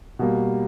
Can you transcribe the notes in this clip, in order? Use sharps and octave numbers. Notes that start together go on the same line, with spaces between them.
B2 G3 A#3